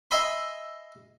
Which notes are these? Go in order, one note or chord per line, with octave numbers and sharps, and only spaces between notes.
D#5 E5 G#5 B5 C6